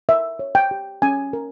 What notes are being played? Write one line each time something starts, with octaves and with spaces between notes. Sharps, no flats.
A#4 E5
C#5
G5
G4
C#4 G#5
A#4